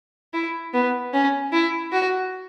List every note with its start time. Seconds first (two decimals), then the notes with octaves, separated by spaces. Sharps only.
0.34 E4
0.74 B3
1.13 C#4
1.53 E4
1.92 F#4